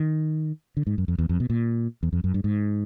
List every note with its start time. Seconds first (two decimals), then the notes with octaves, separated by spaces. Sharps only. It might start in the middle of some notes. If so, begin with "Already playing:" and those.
Already playing: D#3
0.77 D3
0.87 G#2
0.98 F#2
1.08 F2
1.18 E2
1.29 F2
1.40 B2
1.50 A#2
2.03 E2
2.13 F2
2.24 F#2
2.34 G2
2.44 G#2